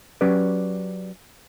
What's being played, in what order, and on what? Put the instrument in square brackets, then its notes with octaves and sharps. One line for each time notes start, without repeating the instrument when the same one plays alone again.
[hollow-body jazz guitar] F#3 C#4 G4 B4 D5